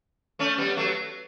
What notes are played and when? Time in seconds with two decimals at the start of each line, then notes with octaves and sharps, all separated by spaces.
0.39 A3 C#4
0.58 G3 B3
0.77 F#3 A3